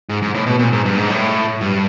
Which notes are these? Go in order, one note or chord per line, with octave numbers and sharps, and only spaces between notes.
G#2
G#2
A2
B2
A#2
G#2
G2
G#2
A2
G2